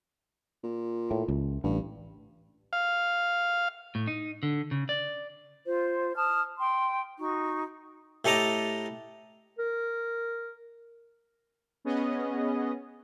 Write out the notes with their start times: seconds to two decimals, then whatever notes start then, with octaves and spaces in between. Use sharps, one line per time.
0.64 A#2
1.11 A2
1.28 C#2
1.64 A1 G2
2.73 F5
3.95 A2
4.07 D#4
4.43 D3
4.71 C#3
4.89 D5
5.67 F4 C5
6.16 A5 D#6 F6
6.59 G5 C6
7.19 D#4 F#4 C#6
8.25 A2 G4 A4 D#5 A#5 D6
9.59 A#4
11.85 B3 C#4 G#4 D#5